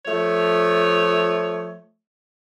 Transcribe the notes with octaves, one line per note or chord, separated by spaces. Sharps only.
F3 A3 C#5